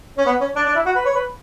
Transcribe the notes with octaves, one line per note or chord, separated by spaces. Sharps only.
C#4
B3
C#4
D4
D4
E4
F#4
B4
C#5
B4